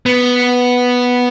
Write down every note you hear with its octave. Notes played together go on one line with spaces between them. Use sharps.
B3